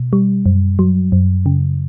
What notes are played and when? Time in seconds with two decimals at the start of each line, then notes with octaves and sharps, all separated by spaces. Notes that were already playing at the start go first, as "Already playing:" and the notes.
Already playing: B2
0.13 G3
0.46 F#2
0.79 F#3
1.12 F#2
1.46 C#3